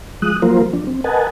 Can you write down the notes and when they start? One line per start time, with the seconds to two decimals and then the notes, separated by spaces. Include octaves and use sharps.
0.22 F3 G#3 D#6 F#6
0.42 F3 F#3 A#3 F4 A#4 C5
0.73 F3 D4
0.87 C4
1.04 A#4 B4 D#5 F#5 G#5 A5